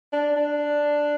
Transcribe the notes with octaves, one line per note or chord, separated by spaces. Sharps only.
D4
D4